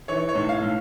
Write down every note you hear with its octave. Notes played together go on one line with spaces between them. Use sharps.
E3 C#5
C#5
A2
F5
A2